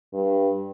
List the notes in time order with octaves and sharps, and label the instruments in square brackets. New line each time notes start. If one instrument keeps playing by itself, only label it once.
[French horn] G2